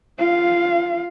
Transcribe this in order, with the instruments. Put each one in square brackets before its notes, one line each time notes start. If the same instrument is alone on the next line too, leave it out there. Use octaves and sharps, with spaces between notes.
[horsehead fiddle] F4 F5